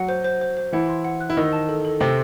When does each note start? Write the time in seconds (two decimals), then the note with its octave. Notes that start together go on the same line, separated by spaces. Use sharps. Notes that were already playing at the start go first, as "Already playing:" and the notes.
Already playing: F#3 F#4 F#5
0.09 C5
0.24 C5
0.41 C5
0.57 C5
0.73 E3 E4 F#5
0.89 C6
1.05 F#5
1.20 F#6
1.30 E4
1.37 D#3 D#4 E6
1.53 A5
1.69 A4
1.85 A4
2.00 C3 C4 A4